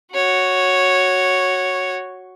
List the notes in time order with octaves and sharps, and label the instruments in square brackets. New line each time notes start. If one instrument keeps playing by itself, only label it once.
[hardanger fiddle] F#4 C#5